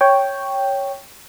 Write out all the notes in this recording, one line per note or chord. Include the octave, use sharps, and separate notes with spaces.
C#5 G5